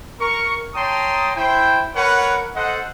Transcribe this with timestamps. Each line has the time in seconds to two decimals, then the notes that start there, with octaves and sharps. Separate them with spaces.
0.20 A#4 C#6
0.75 C#5 G5 A5 A#5 C6 D#6
1.35 E4 C5 G5
1.96 A#4 B4 C#5 F#5
2.55 A4 C5 D#5 F#5